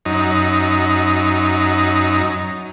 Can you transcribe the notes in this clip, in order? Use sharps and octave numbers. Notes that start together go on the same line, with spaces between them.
F#2 D#4